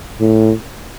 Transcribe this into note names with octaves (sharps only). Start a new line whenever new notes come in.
A2